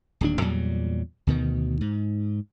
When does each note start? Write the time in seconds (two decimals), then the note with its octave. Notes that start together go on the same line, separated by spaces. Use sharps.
0.21 D1 D#2 D4
0.41 E2 A#2 F#3 G3
1.27 D2 B2 D#3
1.81 G#2